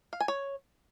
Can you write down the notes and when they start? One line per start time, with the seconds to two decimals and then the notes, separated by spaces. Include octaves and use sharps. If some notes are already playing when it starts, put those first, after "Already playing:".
0.13 F5
0.20 G#5
0.28 C#5